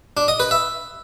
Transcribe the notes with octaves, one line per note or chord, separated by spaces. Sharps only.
D4
D#5
B4
E5